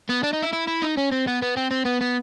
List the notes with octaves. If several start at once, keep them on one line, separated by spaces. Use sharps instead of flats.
B3
D4
D#4
E4
E4
E4
D#4
C#4
C4
B3
B3
C4
C4
B3
B3